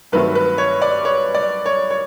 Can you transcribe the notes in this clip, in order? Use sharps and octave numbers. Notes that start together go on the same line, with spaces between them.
G2 D#3 F#3 A3 C4 B4
B4
C#5
D5
C#5
D5
C#5
C#5